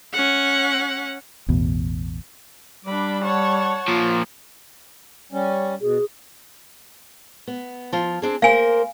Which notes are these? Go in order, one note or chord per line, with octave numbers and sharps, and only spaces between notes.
C#4 F#5
A1 E2 B2
G3 D4 B5 D6
C#5 F#5 A5
A#2 F3 F4
G3 C#4
B2 G#4
B3
F3 F4
C4 D4 G#4
A#3 A#4 C5 F5 G#5